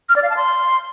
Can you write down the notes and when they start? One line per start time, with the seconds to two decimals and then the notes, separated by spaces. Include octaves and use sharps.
0.09 F6
0.16 D5
0.23 F5
0.30 A5
0.37 C6